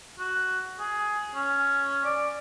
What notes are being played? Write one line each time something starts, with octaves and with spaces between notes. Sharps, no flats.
F#4
G#4
C#4
D5